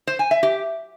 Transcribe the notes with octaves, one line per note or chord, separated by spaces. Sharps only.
C5
G#5
E5
G4